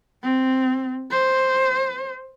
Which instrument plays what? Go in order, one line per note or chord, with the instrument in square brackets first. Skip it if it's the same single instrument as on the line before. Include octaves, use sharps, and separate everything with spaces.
[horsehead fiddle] C4
C5